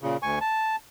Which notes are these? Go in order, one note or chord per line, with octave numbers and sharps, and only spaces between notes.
A#2 C#3
D2 G#5 C#6
A5